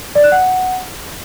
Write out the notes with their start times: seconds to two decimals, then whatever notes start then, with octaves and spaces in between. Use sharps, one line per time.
0.15 D5
0.24 F#6
0.32 F#5